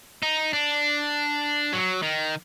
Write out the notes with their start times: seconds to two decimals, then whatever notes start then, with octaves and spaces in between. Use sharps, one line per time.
0.23 D#4
0.53 D4
1.73 F#3
2.02 D#3